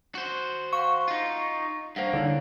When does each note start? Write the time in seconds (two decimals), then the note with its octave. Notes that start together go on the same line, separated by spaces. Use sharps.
0.15 F#4 C5
0.73 F5 F#5 C#6
1.08 D#4 F4
1.96 G2 A#3 C5 F5 F#5
2.14 D3 D#4 E4 C#5